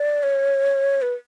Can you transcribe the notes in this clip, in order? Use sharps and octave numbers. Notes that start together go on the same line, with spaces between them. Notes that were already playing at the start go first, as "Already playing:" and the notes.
Already playing: D5
C#5
B4